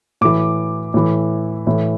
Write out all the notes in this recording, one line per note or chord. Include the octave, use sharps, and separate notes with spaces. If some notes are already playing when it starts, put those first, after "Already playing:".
A2 E3 D6
A2 E3
A2 E3